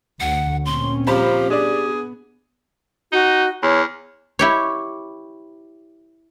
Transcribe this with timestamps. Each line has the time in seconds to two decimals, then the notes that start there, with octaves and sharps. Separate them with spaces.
0.20 D2 F#5
0.66 A#2 C4 C#4 C6
1.07 F3 G4 C5 A#5 B5
1.50 B3 D4 G#4 D5
3.12 D#4 F#4
3.63 E2 C#5
4.39 E4 G4 C#5